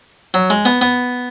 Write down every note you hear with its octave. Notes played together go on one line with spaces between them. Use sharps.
F#3
G#3
B3
B3